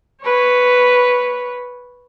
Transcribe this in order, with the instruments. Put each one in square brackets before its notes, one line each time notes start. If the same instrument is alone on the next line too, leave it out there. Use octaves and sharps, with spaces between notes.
[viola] B4 C#5